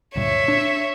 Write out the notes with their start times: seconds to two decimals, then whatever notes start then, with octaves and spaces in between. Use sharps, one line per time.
0.16 D2 G2 A#2 C#5 E5
0.48 D4